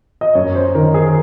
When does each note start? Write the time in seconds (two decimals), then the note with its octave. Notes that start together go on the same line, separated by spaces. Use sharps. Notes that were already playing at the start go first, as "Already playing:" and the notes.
0.21 D#5
0.35 F#2 C#5
0.55 C5
0.75 D#3 A#4
0.94 G#4
1.05 A#4